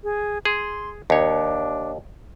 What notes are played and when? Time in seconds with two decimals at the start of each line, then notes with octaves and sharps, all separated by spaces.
0.04 G#4
0.45 G#4 C6
1.10 D#2 D4 C#5